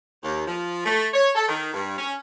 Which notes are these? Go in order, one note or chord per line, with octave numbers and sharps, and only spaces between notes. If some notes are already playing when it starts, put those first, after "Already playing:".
D#2
F3
A3
C#5
A4
D#3
G2
C#4